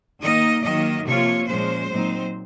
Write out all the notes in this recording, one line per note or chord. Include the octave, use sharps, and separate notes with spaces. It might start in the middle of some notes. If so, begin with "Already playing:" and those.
D#3 A#3 D#4 D#5
D#3 F#3 A#3 D#5
C3 F3 A#3 F4 C#5
A#2 F3 G#3 C#4 C5
A#2 F#3 C4 D#4